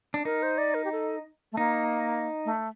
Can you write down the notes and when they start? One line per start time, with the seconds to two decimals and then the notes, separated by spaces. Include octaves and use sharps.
0.14 D4
0.25 D#4 A#4
0.43 C5
0.58 D5
0.74 A#4
0.84 G4
0.92 A4
1.52 A3
1.57 A#3 D#4
2.45 A3